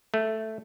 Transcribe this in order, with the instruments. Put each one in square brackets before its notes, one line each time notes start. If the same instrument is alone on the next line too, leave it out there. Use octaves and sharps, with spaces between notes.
[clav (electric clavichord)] A3